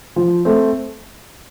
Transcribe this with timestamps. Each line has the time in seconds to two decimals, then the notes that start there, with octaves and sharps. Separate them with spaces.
0.16 F3
0.45 A3 C4